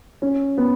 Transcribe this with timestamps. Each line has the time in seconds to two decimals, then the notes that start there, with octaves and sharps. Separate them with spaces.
0.22 C#4
0.58 B3